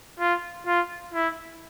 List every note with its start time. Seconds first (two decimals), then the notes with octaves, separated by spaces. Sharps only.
0.20 F4
0.66 F4
1.14 E4